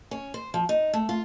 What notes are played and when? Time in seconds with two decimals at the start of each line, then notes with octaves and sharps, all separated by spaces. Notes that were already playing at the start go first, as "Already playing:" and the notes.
0.11 C#4
0.34 C5
0.54 F3
0.69 D#4
0.93 A3
1.09 F4